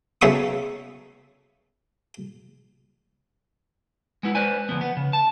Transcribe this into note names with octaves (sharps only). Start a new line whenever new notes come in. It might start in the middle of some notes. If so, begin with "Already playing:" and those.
B1 C#3 E5 C#6 D#6
G#3 B3 E4
B4 C5 D5 G#5
D2 B2 F3 B3
B3
C#3
A5